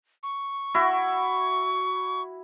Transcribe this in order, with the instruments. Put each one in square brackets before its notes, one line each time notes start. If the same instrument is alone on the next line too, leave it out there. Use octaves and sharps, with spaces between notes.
[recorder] C#6
[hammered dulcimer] E4 F#4